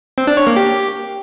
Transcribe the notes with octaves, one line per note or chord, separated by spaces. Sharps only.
C4
D4
C#5
A#3
G4